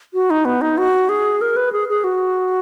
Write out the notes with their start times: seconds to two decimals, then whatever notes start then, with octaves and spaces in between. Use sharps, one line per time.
0.14 F#4
0.30 D#4
0.45 B3
0.61 D#4
0.78 F#4
1.09 G#4
1.41 A#4
1.56 B4
1.72 G#4
1.89 G#4
2.04 F#4